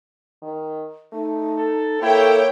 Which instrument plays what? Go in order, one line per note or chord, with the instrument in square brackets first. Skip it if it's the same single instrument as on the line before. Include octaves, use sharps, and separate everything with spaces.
[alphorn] D#3
[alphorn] A3 [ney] D#4
[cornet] A4
[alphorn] A#3 [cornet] E4 [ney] A4 [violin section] C#5 G5